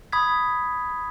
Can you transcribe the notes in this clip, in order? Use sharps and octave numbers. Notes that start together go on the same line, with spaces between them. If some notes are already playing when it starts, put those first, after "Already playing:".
B5 D#6 G#6 B6